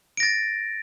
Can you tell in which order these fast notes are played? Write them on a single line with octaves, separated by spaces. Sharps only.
D7 A#6 A6